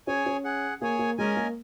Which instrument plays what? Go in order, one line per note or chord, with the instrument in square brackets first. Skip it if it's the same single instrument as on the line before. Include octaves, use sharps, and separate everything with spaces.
[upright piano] C#4 [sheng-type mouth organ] G#4 C#5 G#5
[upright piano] C#4
[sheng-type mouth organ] G#4 F#5
[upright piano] A#3 [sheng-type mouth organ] G#4 C#5 G#5
[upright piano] A#3
[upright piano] G#3 [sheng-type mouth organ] C#4 A#4 D#5 G#5
[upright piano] A#3